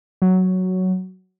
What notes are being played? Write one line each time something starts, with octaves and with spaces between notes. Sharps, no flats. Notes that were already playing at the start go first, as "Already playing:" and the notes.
F#3